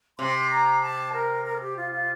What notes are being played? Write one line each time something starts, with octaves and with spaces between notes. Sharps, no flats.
C3 C6
A#5
A5
A#4
A#4
A4
G4
F4
F4